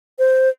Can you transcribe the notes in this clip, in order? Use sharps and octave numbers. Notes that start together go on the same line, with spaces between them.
C5